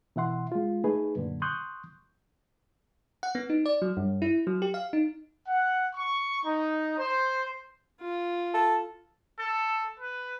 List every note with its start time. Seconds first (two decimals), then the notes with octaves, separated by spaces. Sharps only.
0.16 B2 E3 E5 F#5 C6
0.52 G#3 F4
0.84 A3 D#4 G#4 B4
1.15 F#2 A#2 D3
1.42 C6 C#6 D#6 F#6 G6
3.23 F#5
3.35 B3
3.50 D#4
3.66 D5
3.82 F#3
3.97 G2
4.22 E4
4.47 F#3
4.62 G4
4.74 F5
4.93 D#4
5.47 F#5
5.93 C#6
6.44 D#4
6.98 C5
8.01 F4
8.54 A4
9.39 A4
10.00 B4